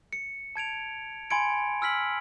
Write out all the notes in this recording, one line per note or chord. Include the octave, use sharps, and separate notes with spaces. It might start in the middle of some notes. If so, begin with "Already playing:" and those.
C#7
A5 G#6 D7 F7
G#5 B5 C6 G#6 C#7 D7
G#5 E6 F6 B6 F#7